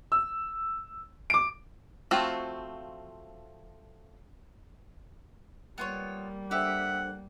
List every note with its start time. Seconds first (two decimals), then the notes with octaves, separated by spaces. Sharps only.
0.12 E6
1.30 D6 D7
2.11 F3 A3 C4 F4 F#4
5.78 G3 A#3 B3 F4 C#5
6.51 D4 G4 A4 C5 E5 F#5